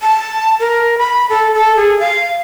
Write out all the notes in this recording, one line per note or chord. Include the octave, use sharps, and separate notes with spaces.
A5
A#4
B5
A4
A4
G#4
F5